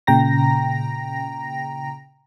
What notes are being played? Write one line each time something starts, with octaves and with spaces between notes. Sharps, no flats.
A#2 C#3 G5 A#5 A#6